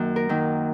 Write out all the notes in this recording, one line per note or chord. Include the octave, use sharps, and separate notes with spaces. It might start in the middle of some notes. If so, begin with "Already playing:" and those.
Already playing: F#2 D#3 F#3 A#3
A#4
D#3 F#3 A#3